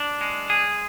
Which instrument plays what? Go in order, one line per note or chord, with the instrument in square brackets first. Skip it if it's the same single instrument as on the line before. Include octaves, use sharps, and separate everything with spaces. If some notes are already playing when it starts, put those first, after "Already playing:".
Already playing: [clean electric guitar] D4
G#3
G#4